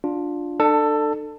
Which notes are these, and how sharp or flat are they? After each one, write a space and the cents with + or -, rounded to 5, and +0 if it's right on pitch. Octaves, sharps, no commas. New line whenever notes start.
D4 +0 F4 +15
D4 +35 A4 +15